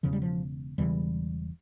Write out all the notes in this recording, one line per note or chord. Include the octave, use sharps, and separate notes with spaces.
E1 E2 C#3 F3
G3
F3
E1 E2 C#3 E3 G3